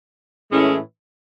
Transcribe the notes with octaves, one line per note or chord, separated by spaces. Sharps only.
A2 E3 G#3 C#4 E4